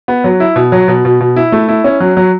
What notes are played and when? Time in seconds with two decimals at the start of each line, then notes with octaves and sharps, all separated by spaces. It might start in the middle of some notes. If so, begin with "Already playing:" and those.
0.08 B3
0.24 F#3
0.40 E4
0.56 B2
0.72 F#3
0.88 B2
1.05 B2
1.20 B2
1.36 E4
1.52 A3
1.69 E4
1.84 C#4
2.00 F#3
2.17 F#3